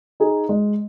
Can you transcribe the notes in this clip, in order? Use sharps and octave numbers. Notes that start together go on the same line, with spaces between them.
D#4 G#4
G#3